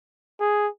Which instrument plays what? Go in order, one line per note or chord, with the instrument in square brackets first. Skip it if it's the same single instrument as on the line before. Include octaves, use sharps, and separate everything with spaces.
[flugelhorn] G#4